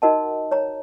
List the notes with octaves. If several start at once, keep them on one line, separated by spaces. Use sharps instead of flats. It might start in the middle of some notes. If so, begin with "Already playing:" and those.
D#4 F#4 A#4 D#5 F#5 A5
C#5 A#5